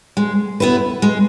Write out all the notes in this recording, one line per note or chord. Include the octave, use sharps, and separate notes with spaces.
G#3
B3 E4 B4
G#3